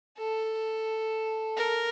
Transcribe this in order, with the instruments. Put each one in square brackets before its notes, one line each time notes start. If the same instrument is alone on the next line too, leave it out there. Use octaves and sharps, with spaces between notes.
[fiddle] A4
A#4